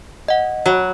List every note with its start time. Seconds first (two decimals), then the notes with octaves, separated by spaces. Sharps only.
0.28 D#5 F#5
0.66 F#3 F#4